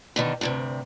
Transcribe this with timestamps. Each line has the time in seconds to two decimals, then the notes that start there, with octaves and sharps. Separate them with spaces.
0.16 B2 D3 D#3
0.41 D2 G2 C3